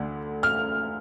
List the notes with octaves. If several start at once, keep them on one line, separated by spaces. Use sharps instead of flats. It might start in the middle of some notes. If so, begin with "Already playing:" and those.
Already playing: D2 D3
F6